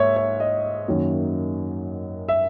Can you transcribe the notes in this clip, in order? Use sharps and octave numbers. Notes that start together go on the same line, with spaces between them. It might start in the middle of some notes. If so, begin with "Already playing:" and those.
Already playing: G#2 A#3 C#5 E5
C#5
D#5
F#2 D#3 F#3 A#3
E5